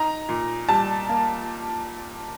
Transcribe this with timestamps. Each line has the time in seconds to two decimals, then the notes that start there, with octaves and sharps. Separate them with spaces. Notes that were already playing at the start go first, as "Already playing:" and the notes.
Already playing: D#4 A#5
0.29 A#2
0.69 G3 A5
1.09 A#3